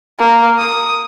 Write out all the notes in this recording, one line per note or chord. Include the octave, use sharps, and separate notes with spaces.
A#3
D#6